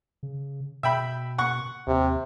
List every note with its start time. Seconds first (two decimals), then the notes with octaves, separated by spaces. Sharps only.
0.23 C#3
0.83 B2 E5 G5 B5
1.38 F#5 C#6
1.87 D#2 C3